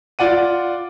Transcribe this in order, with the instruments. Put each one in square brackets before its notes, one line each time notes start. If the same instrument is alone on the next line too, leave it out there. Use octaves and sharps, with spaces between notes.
[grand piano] F4 D5 F#5 D#7